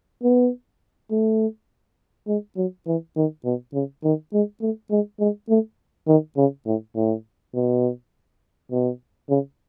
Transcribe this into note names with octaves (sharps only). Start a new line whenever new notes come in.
B3
A3
G#3
F#3
E3
D#3
B2
C#3
D#3
G#3
A3
G#3
G#3
A3
D#3
C#3
A2
A2
B2
B2
C#3